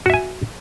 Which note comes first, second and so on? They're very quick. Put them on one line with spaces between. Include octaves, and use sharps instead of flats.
F#4 E5 G#5